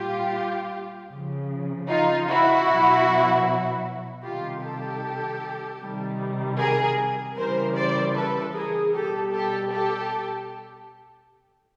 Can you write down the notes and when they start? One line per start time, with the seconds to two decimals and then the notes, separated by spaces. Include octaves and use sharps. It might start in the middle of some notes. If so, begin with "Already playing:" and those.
Already playing: A#2 G3 F4 G4
1.11 C#3 F3
1.89 D#4 F4
2.29 E4 F#4
2.67 B2 F#3
4.24 C3 D#3 G3 F4 G4
4.63 G4 A4
5.81 C3 D#3 G3
6.59 G#4 A#4
7.37 C#3 E3 G3 A#4 C5
7.76 C5 D5
8.15 A4 B4
8.54 G#4 A#4
8.93 B2 G3 G4 A4
9.33 G4 A4
9.72 G4 A4